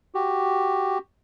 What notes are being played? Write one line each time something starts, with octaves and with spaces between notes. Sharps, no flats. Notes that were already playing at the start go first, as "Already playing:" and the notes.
F#4 G4